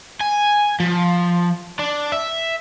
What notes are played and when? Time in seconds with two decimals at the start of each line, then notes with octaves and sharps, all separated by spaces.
0.20 G#5
0.80 F3
1.79 D4
2.12 E5